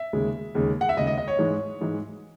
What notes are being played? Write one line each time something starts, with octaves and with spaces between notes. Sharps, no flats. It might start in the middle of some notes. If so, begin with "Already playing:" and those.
Already playing: E5
D#2 C#3 G#3
D#2 C#3 G#3
F#5
E5
D#2 C#3 G#3 D#5
D#5
D#5
C#5
G#2 E3 G#3
G#2 E3 G#3